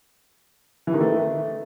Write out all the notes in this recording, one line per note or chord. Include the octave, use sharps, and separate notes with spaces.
E3
D#3
A3